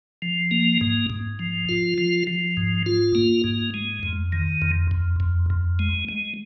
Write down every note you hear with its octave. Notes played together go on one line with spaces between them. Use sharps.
F3
A#3
G#2
G#2
F3
F4
F3
F3
G#2
F4
A#3
G#2
G#3
F2
D#3
F2
F2
F2
F2
G#3
G#3